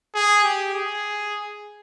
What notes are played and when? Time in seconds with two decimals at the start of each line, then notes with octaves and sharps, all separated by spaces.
0.15 G#4
0.44 G4
0.74 G#4